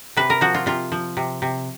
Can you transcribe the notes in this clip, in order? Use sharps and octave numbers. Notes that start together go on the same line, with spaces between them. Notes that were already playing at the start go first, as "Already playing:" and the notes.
C3 B4
A#4
F3 F#4
F4
C3 F4
F3
C3
C3